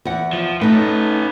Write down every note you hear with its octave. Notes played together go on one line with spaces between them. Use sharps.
E2 F#5
F3
A3 C#4 D#4 B4